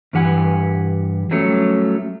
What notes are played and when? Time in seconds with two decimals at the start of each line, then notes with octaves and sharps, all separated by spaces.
0.13 G2 E3 G4 F#5 G#5
1.31 F#3 G3 A3 C#4 C#5